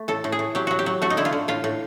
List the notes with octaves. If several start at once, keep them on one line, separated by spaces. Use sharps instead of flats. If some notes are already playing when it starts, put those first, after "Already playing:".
Already playing: A3
A2 A4
A2
G#4
A2
F#3 G4
F#3 F#4
G4
F#3
A3 F#4
D#4
D3 E4
F4
D3
A2 F4
A2